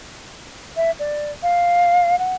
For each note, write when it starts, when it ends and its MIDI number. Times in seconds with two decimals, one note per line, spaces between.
0.76 0.91 76
0.99 1.31 74
1.43 2.18 77
2.19 2.35 78